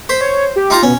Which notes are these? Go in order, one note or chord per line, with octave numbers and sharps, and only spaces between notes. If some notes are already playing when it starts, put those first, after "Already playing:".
C5 B6
C#5
G4
D#4 F4 A#5
B2 C#4